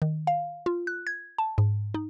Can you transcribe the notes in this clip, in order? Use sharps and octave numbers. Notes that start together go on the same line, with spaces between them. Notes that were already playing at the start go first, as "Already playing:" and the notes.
D#3
F5
F4
F#6
G#6
A5
G#2
D#4